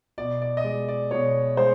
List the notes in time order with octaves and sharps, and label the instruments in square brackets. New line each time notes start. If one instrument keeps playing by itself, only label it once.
[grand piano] B2 D5
D5
D#5
G#3 D5
D5
B2 C#5
G#3 C5